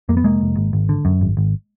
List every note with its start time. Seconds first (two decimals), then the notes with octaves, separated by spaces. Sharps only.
0.09 F2 A#3
0.17 B3
0.24 F1 G#3 A#3
0.41 F1
0.57 G#1
0.73 G#1
0.89 D3
1.05 F#2
1.21 G#1
1.37 G#1